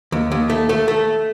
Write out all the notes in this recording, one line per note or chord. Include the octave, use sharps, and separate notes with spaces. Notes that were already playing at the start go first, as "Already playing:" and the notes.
D#2
D#2
A3
A3
A3